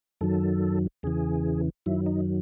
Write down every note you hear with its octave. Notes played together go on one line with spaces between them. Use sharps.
F#2 D#3 F#3 A4
E2 C#3 E3 G#4
F#2 D#3 F#3 E4
D#4